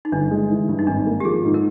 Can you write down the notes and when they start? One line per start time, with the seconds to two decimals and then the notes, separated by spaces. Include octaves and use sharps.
0.05 D#4
0.12 G1 D4
0.31 G#3
0.50 E3
0.68 G2
0.79 D#4
0.87 G#1 D4
1.06 A#3
1.20 G4
1.25 F3 G#4
1.45 G#2
1.54 A#4